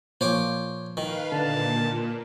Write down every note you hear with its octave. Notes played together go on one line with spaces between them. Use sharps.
A#2 F3 C5 C#5 D6
D#3 B4 F5
A#2 D3 A5